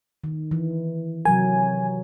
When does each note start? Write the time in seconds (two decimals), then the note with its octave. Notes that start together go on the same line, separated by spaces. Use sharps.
0.24 D#3
0.51 E3
1.25 C3 F#3 A#4 G#5